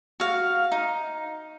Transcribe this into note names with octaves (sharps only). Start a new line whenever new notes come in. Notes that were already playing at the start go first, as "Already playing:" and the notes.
F#4 F5
D#4